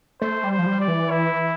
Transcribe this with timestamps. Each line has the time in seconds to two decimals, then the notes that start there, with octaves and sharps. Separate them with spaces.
0.21 A3 C5
0.44 G3
0.51 C5
0.59 F3
0.66 G3
0.81 D5
0.88 E3
1.11 E4